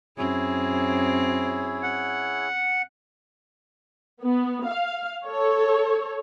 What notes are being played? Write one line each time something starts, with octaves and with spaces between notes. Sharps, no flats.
F#2 C4 E4 G#4 C#5
F#5
B3
F5
A4 C#5